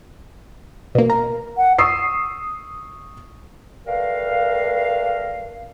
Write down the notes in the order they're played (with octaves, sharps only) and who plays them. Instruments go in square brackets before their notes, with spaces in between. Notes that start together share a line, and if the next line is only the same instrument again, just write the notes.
[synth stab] B2 A#3
A#4
[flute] F#5
[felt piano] C#6 D#6 E6 C7
[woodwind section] G3 A3 A#4 B4 F5